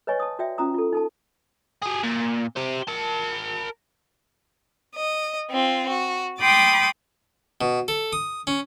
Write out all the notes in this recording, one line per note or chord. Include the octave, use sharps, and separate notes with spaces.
B4 C#5 D#5 G#5 C#6
A5 D#6
F#4 D5 E5 G5
C#4 F4 A#5 D#6
F4 A4
D#4 A4 A5
G4 G#4
A#2
G4 C5
A#4 A5
D#5
C4 F4
F#4
G5 B5 C6 D6 D#6 A6
B2
A4
D#6
C#4